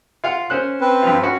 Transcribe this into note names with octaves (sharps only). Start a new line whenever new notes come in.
F4 F5 F#5
C#4 C5 F#6
C4 B4
G2 F3 F4
C#4 F#4